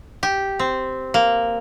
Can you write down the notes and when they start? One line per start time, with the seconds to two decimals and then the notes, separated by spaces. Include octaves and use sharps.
0.23 G4
0.59 C4
1.14 A#3